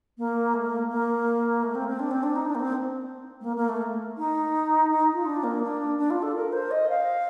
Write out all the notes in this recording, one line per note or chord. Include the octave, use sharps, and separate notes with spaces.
A#3
A3
A#3
A#3
A3
C4
C4
D4
C4
D4
D#4
D4
A#3
C4
A3
A#3
A#3
A3
D#4
D#4
F4
D4
A#3
D4
D4
F4
A4
A#4
C5
D#5
F5